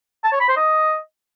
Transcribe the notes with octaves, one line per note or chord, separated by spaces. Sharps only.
A5
C#5
B5
C5
D#5